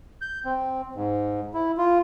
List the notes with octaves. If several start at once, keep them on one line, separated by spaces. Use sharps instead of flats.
G6
C4
G#2
E4
F4